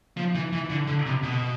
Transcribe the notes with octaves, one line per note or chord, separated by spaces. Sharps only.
F3
E3
E3
D3
D3
C3
B2